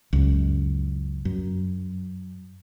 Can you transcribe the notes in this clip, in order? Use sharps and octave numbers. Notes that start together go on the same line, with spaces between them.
C#2 F#2
F#2